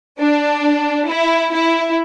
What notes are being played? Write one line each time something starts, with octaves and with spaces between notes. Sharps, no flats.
D4
E4
E4